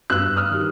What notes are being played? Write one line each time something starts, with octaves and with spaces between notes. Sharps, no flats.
G2 E6 F#6
D#6 F6
D#3 G3